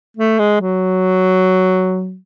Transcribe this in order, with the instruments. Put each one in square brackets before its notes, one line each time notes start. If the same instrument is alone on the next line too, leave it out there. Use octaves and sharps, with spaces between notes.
[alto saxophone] A3
G#3
F#3